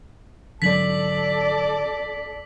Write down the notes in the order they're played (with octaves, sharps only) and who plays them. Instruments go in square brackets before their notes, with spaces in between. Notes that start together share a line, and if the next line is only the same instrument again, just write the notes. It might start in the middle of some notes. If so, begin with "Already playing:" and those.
[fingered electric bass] G#2 D3 F#3 [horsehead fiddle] A4 D5 [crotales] B6 F#7